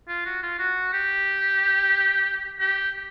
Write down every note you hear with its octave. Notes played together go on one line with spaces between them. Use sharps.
F4
F#4
F4
F#4
G4
G4